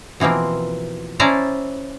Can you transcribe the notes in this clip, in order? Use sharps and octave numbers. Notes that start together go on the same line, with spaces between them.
B2 E3 F3 A#3 C4
C#4 E4 C5 D5 A5 A#5